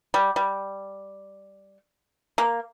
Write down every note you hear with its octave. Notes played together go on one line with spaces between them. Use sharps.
G3
G3
A#3